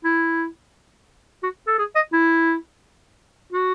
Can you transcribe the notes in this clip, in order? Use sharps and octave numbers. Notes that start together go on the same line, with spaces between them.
E4
F#4
A4
G#4
D#5
E4
F#4